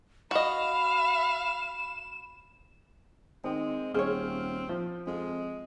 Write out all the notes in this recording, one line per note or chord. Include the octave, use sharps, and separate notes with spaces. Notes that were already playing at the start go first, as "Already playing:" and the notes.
F#4 D#5 F5 B5 E7
D#3 G#3 C4
D#1 C4 G#4 C#5 F6
F3
F2 G#3